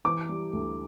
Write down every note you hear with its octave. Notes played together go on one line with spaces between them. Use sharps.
E3 D6
G3
D2